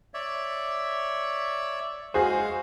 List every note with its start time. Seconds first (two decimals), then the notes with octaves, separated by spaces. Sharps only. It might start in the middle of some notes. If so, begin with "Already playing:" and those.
0.14 C#5 D5 E5
2.14 G#3 F#4 G#4 C5 F5